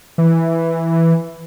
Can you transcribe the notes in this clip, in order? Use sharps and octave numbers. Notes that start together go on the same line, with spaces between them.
E3